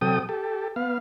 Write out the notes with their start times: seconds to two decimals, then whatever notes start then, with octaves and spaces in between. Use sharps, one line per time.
0.01 C3 F#3 A4 G5 D#6
0.29 G4 A4
0.76 B3 F5